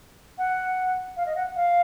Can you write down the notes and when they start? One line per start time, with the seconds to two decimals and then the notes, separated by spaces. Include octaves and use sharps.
0.38 F#5
1.16 F5
1.26 D#5
1.36 F#5
1.56 F5